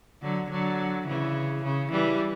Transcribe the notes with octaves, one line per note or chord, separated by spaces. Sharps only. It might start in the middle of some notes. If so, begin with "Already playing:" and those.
D3 F#3
D3 F#3
C#3 E3
C#3
E3 G3